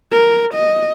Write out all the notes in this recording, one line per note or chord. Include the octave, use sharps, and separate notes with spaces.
A#4
D#5